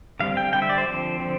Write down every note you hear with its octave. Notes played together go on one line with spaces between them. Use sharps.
D3 G3 C4 F5
G5
D3 G3 C4 G5
E5
D5
C5
D3 F3 C4
D3 F3 C4